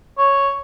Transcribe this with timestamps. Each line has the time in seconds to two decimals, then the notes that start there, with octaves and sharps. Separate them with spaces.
0.18 C#5